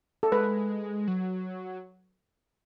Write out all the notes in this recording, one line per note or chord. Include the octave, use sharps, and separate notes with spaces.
A4
G#3 B4
F#3